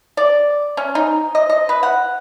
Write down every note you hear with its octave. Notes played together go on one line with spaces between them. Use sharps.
D5
C#4
D#4
D#5
D#5
B4
F#5